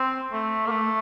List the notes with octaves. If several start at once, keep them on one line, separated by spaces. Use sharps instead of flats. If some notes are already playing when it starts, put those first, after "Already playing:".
Already playing: C4
A3
A#3
A3